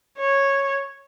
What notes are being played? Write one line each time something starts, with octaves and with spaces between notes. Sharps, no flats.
C#5